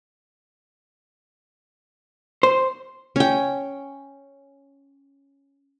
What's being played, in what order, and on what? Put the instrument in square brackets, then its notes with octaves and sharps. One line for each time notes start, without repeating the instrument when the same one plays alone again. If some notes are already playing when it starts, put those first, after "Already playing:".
[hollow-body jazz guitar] C5
[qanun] C#4 G5